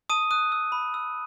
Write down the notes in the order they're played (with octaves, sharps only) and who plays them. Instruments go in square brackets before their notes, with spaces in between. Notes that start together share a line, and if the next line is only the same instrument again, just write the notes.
[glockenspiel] A5 D#6 D#7
D#6 F#6 D#7
E6
B5
E6